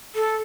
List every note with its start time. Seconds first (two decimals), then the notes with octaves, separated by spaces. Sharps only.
0.15 A4